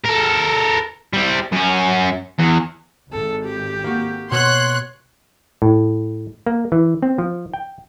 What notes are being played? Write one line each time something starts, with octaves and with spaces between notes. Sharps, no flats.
A4 A#4
G3 C4
F#2 C#4
E2
G#1 A4
G4
A#3 F#4
B2 C#5 C6 C#6 F#6
A2
A#3
E3
C4
F3
G5